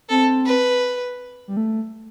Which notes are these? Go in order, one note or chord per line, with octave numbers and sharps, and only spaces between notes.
C4 A4
B4
G3
A3